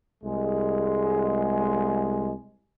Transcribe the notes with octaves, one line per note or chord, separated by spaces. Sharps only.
C2 G#3